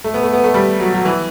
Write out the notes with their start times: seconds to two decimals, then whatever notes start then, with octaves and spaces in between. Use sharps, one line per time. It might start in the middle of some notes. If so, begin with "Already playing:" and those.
0.04 A3
0.14 B3
0.23 A3
0.33 B3
0.44 A3
0.54 G3
0.80 F#3
0.94 F#3
1.05 E3